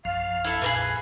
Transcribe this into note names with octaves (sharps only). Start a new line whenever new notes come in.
A#1 F#2 F3 F5
E4 A4
F2 A#2 G#4 A#4 B4